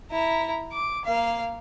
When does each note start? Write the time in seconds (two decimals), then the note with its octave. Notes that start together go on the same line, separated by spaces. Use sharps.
0.11 E4 A#5
0.72 D6
1.05 A#3 F5